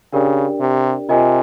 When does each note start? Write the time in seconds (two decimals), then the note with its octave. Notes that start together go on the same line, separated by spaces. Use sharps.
0.12 C#3 D4 G4 A#4 D5 G5
0.60 C3
1.09 C3 F4 A#4 D#5 G#5